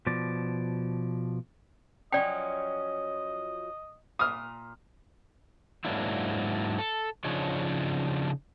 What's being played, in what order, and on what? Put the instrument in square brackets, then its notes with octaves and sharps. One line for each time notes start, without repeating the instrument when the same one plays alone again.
[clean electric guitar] B2 F3 D5
[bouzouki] F3 F#3 C#4 [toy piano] D5 G5 [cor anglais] D#5
[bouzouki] A#2 [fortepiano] D#6 F6
[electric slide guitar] G#2 F#3 A#3 D4 E4
A4
C#3 F3 D4 D#4 C#5